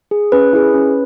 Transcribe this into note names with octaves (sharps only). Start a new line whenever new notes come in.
G#4
C#4 B4
E4 G#4
C#4